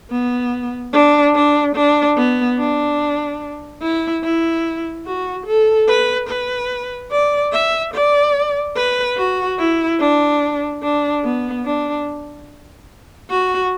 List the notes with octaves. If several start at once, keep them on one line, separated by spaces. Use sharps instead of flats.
B3
D4
D4
D4
B3
D4
E4
E4
F#4
A4
B4
B4
D5
E5
D5
B4
F#4
E4
D4
D4
B3
D4
F#4